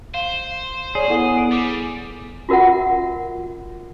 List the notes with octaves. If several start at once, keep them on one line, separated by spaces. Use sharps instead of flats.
C5 F5
G#4 C#5 D5
B3 E4 A4 F#5
D7
G3 D6
F4 F#4 A#4 E5 F#5